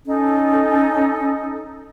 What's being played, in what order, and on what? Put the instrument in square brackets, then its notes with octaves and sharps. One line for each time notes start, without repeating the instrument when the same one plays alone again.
[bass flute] C#4 [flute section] D#4 A4